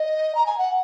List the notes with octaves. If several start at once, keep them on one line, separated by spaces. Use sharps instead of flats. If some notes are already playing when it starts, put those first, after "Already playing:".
Already playing: D#5
A#5
G#5
F#5